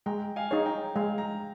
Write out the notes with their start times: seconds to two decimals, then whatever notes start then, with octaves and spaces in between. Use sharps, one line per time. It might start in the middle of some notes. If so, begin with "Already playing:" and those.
0.06 G#3 G5 A#5
0.36 F5 G#5
0.51 D#4 G#4 C#5
0.65 G5 A#5
0.95 G#3 F5 G#5
1.18 G5 A#5